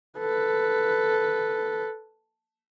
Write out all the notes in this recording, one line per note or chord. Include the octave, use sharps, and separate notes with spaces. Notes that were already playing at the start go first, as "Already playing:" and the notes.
A4 B4